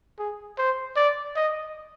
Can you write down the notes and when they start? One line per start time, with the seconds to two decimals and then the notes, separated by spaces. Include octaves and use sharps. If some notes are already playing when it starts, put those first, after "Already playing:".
0.18 G#4
0.58 C5
0.96 D5
1.36 D#5